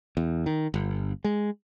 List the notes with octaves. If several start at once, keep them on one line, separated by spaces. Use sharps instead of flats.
E2
D#3
G1
G#3